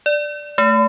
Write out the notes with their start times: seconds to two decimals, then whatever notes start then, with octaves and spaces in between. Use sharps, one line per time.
0.06 D5
0.58 A3